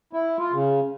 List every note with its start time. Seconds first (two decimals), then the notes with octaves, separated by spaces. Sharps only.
0.13 E4
0.38 F4
0.52 C#3